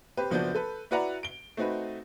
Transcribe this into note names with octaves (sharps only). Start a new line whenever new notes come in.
C4 G4 B4
F#1 F3 B3 D4 F#4 G6
A4 B4 B5
E4 F#4 B4 D5 F#5 A#5
D7 G7
A3 C4 D#4 F#4 B4